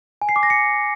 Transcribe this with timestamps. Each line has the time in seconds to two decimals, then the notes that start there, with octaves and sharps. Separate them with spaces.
0.22 G#5
0.29 C7
0.36 D6
0.43 A#6
0.50 C#7